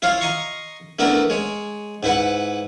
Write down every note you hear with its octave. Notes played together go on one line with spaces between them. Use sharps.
E4 F4 C#5 F5
D#5 A#5 C6 C#6
A3 B3 D4 E4 A4 A#4
G#3 C#5
G#2 E4 B4 F#5